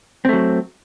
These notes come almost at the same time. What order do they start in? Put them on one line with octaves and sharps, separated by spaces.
C4 A3 F#3